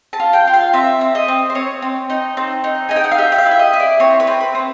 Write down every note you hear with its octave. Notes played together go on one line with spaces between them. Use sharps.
A5
F4
G5
F4
F5
C4 E5
C4
D#5
C4
C5
C4 C#5
C4
D#4
C4
D#4
D#4 G#5
G5
F#5
F5
G4 E5
E5
F5
E4
E5
D#5
E4
D5
C4 C#5
B4
C4
B4
C4